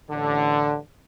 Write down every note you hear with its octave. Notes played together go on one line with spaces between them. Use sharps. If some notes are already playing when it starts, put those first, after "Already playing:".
A1 D3